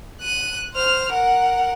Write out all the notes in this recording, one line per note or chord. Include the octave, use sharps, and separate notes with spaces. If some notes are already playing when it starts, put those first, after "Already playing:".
F#6 D#7
C5 F6
A#4 F#5